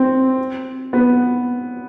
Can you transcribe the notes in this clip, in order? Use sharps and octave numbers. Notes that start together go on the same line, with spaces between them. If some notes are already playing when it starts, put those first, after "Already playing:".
Already playing: C4
B3